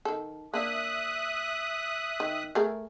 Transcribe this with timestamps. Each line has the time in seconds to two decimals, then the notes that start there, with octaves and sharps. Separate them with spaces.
0.05 D#3 A4
0.54 A#3 D4 E5 D#6 F#6
2.20 D#3
2.55 A3 G#4 A#4